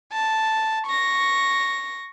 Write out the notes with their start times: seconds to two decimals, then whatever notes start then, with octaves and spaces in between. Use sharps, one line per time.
0.13 A5
0.86 C#6 A#6